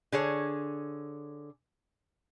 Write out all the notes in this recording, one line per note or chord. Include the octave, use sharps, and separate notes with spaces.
D3 G#4 C#5